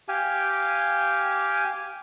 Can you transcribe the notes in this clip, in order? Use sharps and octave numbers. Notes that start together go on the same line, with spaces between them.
G4 F5 G#5